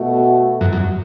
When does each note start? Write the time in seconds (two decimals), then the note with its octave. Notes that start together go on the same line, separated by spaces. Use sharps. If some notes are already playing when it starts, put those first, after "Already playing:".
Already playing: B2 A3 F#4
0.61 F#2
0.73 F#2